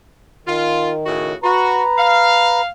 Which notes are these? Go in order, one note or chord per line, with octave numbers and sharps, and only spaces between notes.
D#3 F4
A2 C#3 F#4
F#4 B4 A#5
F5